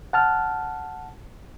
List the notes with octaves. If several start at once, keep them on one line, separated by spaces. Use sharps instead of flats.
F#5 A5 F6